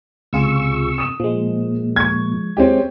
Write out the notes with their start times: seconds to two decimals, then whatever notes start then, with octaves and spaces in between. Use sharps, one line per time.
0.33 C#2 C3 F4 G#4 C#6 E6
0.98 D#6 E7
1.20 A#2 F3 G#3
1.96 C#6 G#6
2.57 G#3 C4 C#4 G4